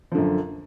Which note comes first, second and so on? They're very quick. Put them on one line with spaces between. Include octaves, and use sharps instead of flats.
F3 D3 F#2